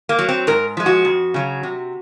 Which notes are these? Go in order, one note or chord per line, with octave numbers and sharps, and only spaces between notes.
A#3
F#3
C4
G#2 A#4
F3 G#3
F#4
F2
C#3 F#3
C3